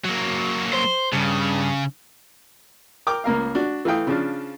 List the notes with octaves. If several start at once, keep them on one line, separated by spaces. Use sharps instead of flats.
F#3 A#3
C5
G2 C#3
A#4 G5 A#5 D6
C#2 A#3 A#4 F5
D4 F#4
E3 A3 F5 G5 D#6
C#3 F3 D4